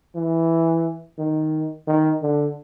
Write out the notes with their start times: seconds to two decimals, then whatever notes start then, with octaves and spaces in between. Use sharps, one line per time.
0.15 E3
1.18 D#3
1.87 D#3
2.22 D3